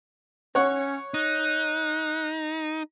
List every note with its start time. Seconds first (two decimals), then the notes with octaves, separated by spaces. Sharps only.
0.55 C#4 C#5 F#5 C#6
1.14 D#4 F#6